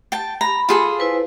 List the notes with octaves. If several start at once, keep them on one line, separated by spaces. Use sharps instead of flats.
G5 A5
A#5 B5
F4 G#4 A4
E4 B4 C5